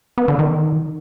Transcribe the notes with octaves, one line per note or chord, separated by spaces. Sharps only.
B3
D3
D#3